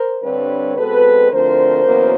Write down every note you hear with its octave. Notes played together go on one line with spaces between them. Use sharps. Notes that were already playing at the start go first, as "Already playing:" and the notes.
Already playing: A#4 C5
G2 D3 G3 C4 B4 C#5
B2 G#3 C4 A4 B4
D2 D3 F3 A3 C4 A#4 C5
E2 B2 F#3 A#3 C#4